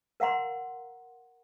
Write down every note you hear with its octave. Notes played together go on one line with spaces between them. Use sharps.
A#4 F5 F#5 A#5 C6